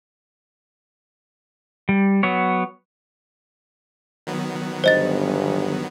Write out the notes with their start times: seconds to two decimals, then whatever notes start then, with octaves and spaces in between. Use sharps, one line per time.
1.89 G3
2.23 F#3 B3 C#5
4.27 D#3 F#3 B3
4.84 G1 C5 D#5 A6